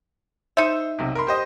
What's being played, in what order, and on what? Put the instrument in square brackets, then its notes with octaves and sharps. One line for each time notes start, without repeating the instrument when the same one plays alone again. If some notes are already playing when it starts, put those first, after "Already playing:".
[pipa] D#4 E5 [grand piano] C5
[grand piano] B1 C3
A#4 B5 C6
G4 C5 D#5